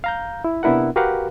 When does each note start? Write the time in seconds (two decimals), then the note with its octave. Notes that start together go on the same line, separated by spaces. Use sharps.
0.04 F5 A#5 G6
0.44 E4
0.63 C3 B3 D4 E4 A#4 F#5
0.96 F#4 G4 A#4 B4 F5 F#5